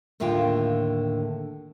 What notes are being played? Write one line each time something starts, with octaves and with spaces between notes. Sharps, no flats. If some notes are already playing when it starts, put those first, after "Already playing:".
D#2 A2 D3 F4 F5 G5